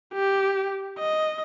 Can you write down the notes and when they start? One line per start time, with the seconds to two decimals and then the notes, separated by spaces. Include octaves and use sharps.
0.14 G4
0.99 D#5